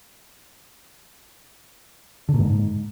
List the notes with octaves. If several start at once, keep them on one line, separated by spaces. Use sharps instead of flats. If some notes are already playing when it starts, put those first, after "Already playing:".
D3
A#2
G#2